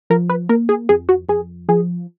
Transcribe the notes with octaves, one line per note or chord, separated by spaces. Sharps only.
F3 A#4
B4
A#3 A#4
G#4
F2 G#4
F#4
F2 G#4
F3 G#4